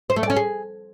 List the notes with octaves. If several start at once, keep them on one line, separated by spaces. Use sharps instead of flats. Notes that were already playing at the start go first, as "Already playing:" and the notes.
C5
A3
D5
C#4
G#4